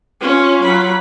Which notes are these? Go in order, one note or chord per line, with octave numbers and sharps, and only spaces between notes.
C#4 F4
F#3 B5